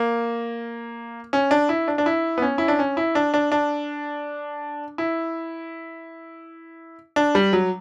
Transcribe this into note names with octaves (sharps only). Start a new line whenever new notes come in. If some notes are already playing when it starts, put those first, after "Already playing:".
Already playing: A#3
C#4
D4
E4
D4
D4
E4
B3
C#4
E4
D4
C#4
E4
D4
D4
D4
E4
D4
G3
F#3